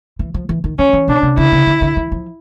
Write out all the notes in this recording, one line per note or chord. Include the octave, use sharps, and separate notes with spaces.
E3
F3
E3
D#3
F3 C#4
E3
B2 D4
C3
C#3 E4
C#3
D3
D3
E3
F3